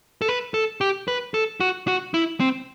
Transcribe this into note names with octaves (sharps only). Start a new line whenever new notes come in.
A4
B4
A4
G4
B4
A4
F#4
F#4
E4
C4